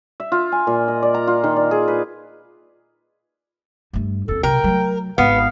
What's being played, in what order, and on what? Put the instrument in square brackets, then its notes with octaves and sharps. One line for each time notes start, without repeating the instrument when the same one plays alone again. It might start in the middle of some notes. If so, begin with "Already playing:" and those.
[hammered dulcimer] E5
F4
G#5
A#2
D#5
D5
A#5
F4
D#3
D5
G#4
B4
[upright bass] G2 A3
[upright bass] F#2 C4 [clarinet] A4
[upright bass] B1 C3 [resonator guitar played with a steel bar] A#4 [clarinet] G5
[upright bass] F#3 A3
[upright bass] G#1 [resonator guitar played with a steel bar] B3 [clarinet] F5